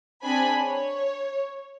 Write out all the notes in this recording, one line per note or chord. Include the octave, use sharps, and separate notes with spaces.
C4 D4 G#4 G#5 B5
C#5